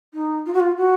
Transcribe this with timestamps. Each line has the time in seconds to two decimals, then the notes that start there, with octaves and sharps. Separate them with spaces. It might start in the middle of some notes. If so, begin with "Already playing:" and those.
0.14 D#4
0.46 F4
0.53 F#4
0.60 F4
0.77 F#4